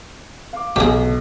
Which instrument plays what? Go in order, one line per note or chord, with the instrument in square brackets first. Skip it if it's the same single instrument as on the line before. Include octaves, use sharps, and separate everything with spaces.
[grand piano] F5 D6
[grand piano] B1 [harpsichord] G4 G#4